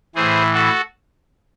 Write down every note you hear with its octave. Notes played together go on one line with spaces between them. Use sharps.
A2 E3 G#4 C5
F#4 A4